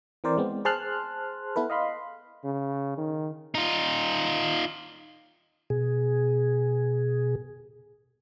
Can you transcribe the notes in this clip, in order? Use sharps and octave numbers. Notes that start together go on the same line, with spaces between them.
E3 C4 A#4 C5 D5
G#3 B3 C4
G#4 C5 A5 C6 F6 F#6
B3 E4 A4 B4
D#5 F5 B5 C6
C#3
D#3
D#4 F4
B2 G#4